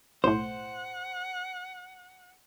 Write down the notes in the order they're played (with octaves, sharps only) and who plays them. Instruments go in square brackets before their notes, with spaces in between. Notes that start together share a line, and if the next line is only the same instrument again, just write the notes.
[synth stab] B1 A2 [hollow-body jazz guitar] C5 [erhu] F#5